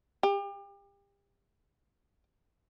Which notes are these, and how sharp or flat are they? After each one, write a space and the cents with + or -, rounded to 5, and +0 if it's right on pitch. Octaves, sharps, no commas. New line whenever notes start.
G4 +35